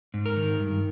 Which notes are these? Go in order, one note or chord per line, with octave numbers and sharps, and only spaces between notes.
G#2
A#4
D#3
G2